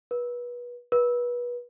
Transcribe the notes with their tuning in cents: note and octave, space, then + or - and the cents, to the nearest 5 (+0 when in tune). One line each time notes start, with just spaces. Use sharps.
B4 -30
B4 -30